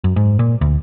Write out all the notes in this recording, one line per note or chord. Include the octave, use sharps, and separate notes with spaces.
F#2
G#2
A#2
D2